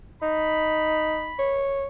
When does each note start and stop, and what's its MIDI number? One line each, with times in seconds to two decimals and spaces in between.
0.22 1.31 63
0.22 1.57 83
1.39 1.87 73